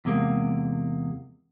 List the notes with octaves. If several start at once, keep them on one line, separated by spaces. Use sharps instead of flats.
E2 C3 G#3 A#3